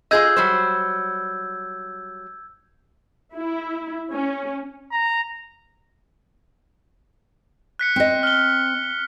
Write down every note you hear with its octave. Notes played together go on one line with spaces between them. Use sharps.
F4 G#4 D#5 E6 G6 G#6
F#3 G3 C5
E4
C#4
A#5
F#6 B6 C#7
C4 D#5
F6 G7